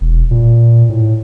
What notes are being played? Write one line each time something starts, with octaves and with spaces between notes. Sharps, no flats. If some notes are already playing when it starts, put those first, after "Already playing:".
E1
A#2
A2